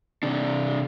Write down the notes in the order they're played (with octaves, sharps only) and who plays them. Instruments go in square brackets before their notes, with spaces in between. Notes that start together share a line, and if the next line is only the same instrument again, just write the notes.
[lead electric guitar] C3 D4